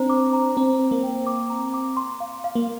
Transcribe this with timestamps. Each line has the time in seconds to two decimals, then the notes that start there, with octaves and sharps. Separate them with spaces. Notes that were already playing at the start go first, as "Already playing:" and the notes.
Already playing: C4 D4 C5 A#5
0.10 D6
0.33 A#5
0.57 C4 A#5
0.80 C5
0.91 A#3
1.03 G5
1.27 D6
1.50 A#5
1.74 D6
1.97 C6
2.20 F5
2.44 F5
2.55 A#3